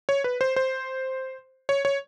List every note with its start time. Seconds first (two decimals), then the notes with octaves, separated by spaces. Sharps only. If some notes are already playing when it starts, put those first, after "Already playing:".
0.09 C#5
0.24 B4
0.41 C5
0.56 C5
1.69 C#5
1.85 C#5